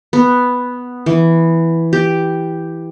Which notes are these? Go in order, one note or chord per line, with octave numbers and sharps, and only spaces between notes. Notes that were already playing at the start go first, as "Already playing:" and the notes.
B3
E3
G4